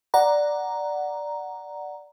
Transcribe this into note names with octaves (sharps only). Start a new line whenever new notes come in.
D5 F#5 A#5